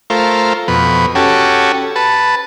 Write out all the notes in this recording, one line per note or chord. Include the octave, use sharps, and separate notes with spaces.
A3 F4 A#4 C5
F2 B2 B4
C#4 F#4 G4 A4
B4 A5